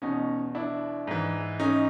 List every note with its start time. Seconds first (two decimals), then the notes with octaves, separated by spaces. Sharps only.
0.02 E2 B2 C#4 D#4
0.55 D4 E4
1.07 G#2 E3
1.60 C#4 D#4